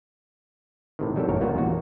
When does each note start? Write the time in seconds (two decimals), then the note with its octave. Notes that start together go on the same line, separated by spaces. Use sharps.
0.99 A2 C3 D#3
1.16 F#3 G3 G4 A4
1.29 A1 F#2 A#2 A#4 C#5
1.40 G3 A#3 B3 D#4 F4 F#4
1.55 E2 A#2 F#4